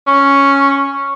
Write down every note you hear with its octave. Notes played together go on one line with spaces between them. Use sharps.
C#4